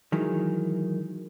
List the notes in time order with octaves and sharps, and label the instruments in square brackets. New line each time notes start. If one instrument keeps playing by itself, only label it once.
[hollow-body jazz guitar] D#3 E3 F#3 G#3